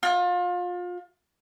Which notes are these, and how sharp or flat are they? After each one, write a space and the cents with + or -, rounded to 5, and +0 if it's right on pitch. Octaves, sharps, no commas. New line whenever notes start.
F4 +30